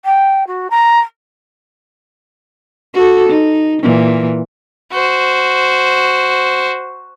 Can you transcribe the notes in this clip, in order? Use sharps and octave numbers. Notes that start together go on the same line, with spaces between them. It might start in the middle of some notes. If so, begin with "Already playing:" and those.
G5
F#4
A#5
F#4 A4
D#4
A#2 E3
F#4 C5